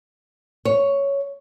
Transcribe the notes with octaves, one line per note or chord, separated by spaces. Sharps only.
C#5